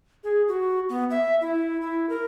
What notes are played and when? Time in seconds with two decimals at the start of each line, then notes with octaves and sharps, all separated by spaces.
0.24 G#4
0.48 F#4
0.89 B3
1.10 E5
1.41 E4
1.81 E4
2.09 A#4